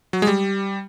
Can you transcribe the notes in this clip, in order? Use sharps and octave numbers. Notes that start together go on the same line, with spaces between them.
F#3
G#3
G3